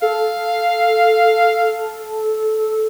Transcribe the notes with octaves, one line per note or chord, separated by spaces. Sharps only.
A4 F5